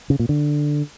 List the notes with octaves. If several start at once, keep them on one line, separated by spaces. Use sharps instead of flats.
C#3
A#2
D3